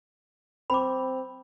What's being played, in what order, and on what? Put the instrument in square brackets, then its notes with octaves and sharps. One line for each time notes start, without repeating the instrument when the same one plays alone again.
[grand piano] C4 [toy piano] B5 D6